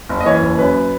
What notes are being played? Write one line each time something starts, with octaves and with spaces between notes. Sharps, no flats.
F#1
D#5
E3 C#5
F#1
F#2 B4